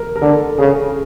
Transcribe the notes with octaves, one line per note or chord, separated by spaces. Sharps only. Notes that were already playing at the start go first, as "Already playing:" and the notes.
Already playing: A#4
A#4
D3 A4
C#3 G#4